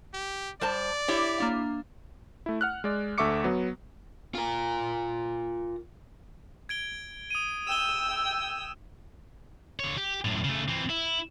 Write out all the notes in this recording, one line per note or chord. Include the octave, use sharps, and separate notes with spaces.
G4
G3 C5 D5 A5
E4 G4 C#5 E5 D6
A#3 D4 F5
A3 E4
F#5 F6 F#6
G#3 D5
D2 A4 E5 C#6 D6 C#7
F#3 B3
F4 A#4
G#6 D7 G7
D#6 D#7
G5 E6 E7 G7
D3 C#5
G4
F#2 A2
C#3 A3
E3 C4
E4